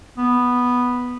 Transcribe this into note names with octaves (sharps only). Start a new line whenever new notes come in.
B3